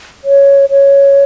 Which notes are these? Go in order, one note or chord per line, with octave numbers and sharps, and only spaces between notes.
C#5
C#5